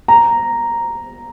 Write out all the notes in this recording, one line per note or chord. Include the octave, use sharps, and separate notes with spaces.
A#5